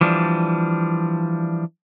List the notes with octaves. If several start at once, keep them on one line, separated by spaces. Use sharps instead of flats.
E3 F3 G3 D4